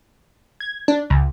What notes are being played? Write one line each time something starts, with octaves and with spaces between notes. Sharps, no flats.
G#6
D4
C#2